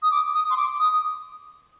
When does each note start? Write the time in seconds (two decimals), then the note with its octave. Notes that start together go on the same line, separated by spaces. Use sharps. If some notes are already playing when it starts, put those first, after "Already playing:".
0.03 D#6
0.11 D6
0.34 D#6
0.50 C6
0.57 D6
0.79 D#6